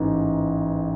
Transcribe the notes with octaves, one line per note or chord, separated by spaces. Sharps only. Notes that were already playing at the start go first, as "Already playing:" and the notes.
Already playing: A1 G#2 E3 D#4